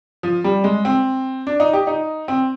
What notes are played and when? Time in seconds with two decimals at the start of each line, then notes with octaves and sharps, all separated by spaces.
0.23 F3
0.44 G3
0.64 G#3
0.85 C4
1.47 D4
1.60 D#4
1.73 G4
1.87 D#4
2.28 C4